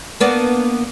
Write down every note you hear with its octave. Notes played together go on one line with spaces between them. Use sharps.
A#3 B3 D4